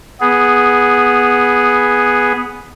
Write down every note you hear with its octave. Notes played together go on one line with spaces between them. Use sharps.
B3 G#4